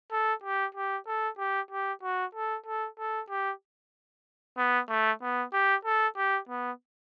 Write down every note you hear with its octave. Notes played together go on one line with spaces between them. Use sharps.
A4
G4
G4
A4
G4
G4
F#4
A4
A4
A4
G4
B3
A3
B3
G4
A4
G4
B3